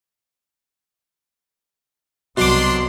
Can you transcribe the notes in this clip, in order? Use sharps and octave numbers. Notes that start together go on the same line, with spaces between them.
C2 B2 F#3 D4 C6 D6